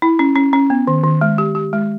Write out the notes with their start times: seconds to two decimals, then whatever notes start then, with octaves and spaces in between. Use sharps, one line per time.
0.02 E4
0.19 C#4
0.35 C#4
0.53 C#4
0.70 B3
0.87 D#3
1.04 D#3
1.21 G#3
1.38 G4
1.55 G4
1.73 G#3